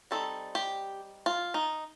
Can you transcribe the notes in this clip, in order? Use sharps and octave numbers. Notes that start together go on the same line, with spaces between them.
G3 C4 D#4 A4
G4
F4
D#4